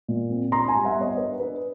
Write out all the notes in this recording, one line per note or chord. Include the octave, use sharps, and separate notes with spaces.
A#2
C4
D4 A#5 C6
G#5 A#5
G3
E5 F#5
B3
C#5 D#5
D4 B4
D4 B4